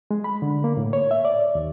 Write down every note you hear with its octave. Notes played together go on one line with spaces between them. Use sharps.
G#3
B5
D3
A#3
A2
C#5
E5
D5
D#2